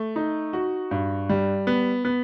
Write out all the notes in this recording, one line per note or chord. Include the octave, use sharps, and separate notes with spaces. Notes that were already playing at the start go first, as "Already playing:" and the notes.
Already playing: A3
D#4
F#4
G2
G3
B3
B3